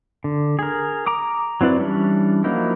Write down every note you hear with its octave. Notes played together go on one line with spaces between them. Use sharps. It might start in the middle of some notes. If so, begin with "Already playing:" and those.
D3
G#4 A#4
A#5 D6 D#6
F#3 C4 E4 B4 D5
E3 G3 C#4 D4
F3 F#3 A#3 D#4 E4